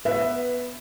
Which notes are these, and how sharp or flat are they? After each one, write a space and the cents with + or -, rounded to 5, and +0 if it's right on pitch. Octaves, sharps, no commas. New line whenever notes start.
B3 +0 B4 +0 E5 +10